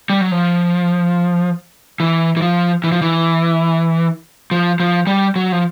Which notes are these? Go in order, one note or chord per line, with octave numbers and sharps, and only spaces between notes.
G3
F#3
F3
E3
E3
F3
E3
F3
E3
F3
F3
G3
F#3
F3